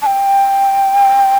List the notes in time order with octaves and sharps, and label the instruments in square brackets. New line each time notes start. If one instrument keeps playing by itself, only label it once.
[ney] A5
G5